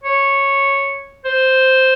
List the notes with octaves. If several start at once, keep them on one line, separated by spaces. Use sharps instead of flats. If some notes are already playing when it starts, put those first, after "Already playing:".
C#5
C5